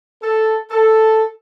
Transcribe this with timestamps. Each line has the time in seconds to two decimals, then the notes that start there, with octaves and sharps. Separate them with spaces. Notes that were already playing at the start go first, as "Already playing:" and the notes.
0.22 A4
0.70 A4